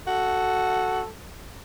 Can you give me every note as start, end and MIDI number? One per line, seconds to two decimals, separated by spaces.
0.07 1.01 66
0.07 1.09 69